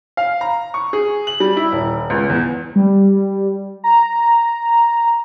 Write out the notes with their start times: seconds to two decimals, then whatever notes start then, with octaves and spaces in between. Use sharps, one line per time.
0.17 F5
0.41 A#5
0.74 C#6
0.93 G#4
1.27 F#7
1.40 G3
1.57 E4
1.72 D#1
2.10 C#2
2.30 E2
2.76 G3
3.84 A#5